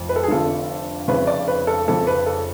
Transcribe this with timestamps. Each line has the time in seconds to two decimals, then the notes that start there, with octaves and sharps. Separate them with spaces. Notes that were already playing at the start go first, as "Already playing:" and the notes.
Already playing: F1 F2
0.09 B4
0.16 A4
0.23 G#4
0.28 F1 F2 D3 F3 A4
1.08 F1 F2 C#3 B4
1.27 D5
1.48 B4
1.67 A4
1.87 F1 F2 C#3 A4
2.07 B4
2.26 A4